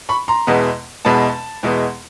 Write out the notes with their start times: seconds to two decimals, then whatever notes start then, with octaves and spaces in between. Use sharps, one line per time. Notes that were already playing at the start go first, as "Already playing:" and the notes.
0.09 B5 C#6
0.28 A#5 C6
0.47 E2 B2 G#3 B3
1.05 E2 B2 G#3 B3 A5 B5
1.63 E2 B2 G#3 B3